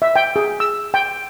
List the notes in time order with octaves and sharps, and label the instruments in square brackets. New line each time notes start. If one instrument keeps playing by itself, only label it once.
[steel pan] E5
G5
G#4
E6
G5